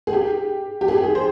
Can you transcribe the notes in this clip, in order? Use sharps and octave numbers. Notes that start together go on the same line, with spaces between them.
G#4
G4
G4
G#4
G4
G#4
C5